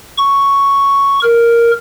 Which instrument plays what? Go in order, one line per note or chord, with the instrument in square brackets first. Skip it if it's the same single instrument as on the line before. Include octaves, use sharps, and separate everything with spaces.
[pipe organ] C#6
A#4